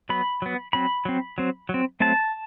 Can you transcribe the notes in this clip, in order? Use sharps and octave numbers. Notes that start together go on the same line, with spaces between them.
F#3 B3 B5
F#3 B3
F#3 C4 B5
F#3 C4
F#3 C4
F#3 C4
F#3 A3 C4 A5